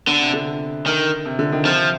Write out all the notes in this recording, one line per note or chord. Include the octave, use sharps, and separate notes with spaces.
D3 B3
C3
D3
D#3
C3
D3
D#3
C3 F3